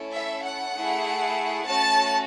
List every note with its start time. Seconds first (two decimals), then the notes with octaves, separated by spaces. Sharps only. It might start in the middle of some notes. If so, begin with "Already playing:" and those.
Already playing: A3 C#4 E4 A4
0.13 E5
0.44 F#5
0.75 A3 E4 G#4
1.64 A3 C#4 F#4 A5